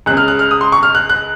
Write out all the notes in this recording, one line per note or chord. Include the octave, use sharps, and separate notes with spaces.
C#2 C#3 F#6
F6
F#6
F6
D#6
C6
C#6
F6
F#6
F#6